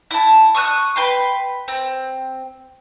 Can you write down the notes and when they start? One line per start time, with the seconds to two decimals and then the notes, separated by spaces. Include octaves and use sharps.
0.11 E4 A5
0.55 C#6 D#6 E6 F#6
0.96 B4 G5 C6
1.68 C4